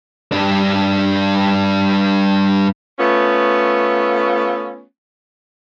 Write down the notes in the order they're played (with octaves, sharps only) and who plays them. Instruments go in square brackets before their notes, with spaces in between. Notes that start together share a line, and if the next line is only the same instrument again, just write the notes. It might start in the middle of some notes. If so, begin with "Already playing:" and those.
[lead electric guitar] G2 D4
[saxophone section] A3 B3 C#4 F4